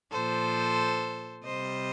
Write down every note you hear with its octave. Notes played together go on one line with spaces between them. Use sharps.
A#2 F3 A4 C5
C3 G3 C5 D#5